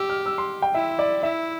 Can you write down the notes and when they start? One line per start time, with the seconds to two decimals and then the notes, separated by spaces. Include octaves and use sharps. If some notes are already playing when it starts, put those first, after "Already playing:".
Already playing: G4 E6
0.10 F6
0.26 E6
0.38 C6
0.62 G5
0.75 E4 E5
0.99 D5
1.23 E4 E5